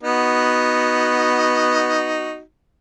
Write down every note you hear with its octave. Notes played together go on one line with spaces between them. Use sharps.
B3 D#4 F#4